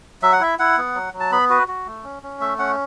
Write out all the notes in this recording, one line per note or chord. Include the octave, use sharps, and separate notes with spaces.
F#3 E5
F#5
E4 E5
E4 F#5
B3
F#3
F#3
A5
B3 B5
F#4 B4
F#4
A3
C#4
C#4
A3 E5
C#4 F#5